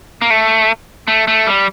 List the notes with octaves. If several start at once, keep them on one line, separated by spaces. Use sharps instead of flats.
A#3
A3
A3
A3
G3